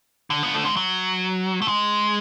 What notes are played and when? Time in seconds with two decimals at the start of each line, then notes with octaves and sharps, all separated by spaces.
0.30 D3
0.43 B3
0.54 A3
0.65 G#3
0.76 F#3
1.62 A3
1.68 G#3